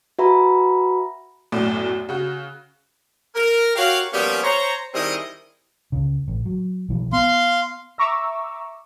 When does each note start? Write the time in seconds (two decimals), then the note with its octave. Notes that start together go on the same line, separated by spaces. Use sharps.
0.19 F#4 B4 E5 A#5 B5
1.52 B1 F#2 A2 D5
2.09 C#3 F#4
3.36 A#4
3.76 F#4 G4 A#4 C#5 F5
4.13 F3 G3 A#3 B3 C#4
4.44 C5 C#5 A#5
4.94 D#3 G3 C4 E4 G#4 D#5
5.92 C#2 C#3
6.28 A1
6.46 F#3
6.89 B1 E3 F3
7.13 B3 F5 C6
7.98 E5 A#5 C#6 D6 E6